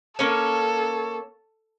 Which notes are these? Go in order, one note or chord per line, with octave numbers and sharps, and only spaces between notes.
A#3 C#4 A4 C#5